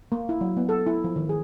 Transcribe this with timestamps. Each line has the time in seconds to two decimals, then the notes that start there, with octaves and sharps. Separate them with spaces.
0.12 A#3
0.29 E4
0.41 F#3
0.57 B3
0.69 A4
0.87 E4
1.04 F3
1.16 D#3
1.29 G#4